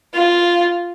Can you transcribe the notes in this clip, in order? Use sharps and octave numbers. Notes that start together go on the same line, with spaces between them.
F4